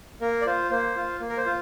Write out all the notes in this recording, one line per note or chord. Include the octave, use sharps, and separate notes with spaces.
A#3 A#4
D5
F4 C5
A#3 C5
F4
A#3
A#4
C5
F4